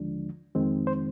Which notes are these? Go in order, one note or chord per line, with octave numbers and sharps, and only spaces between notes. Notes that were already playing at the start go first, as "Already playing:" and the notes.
Already playing: D#2 D3 F3 G#3 D4
F2 D#3 G#3 C4
C5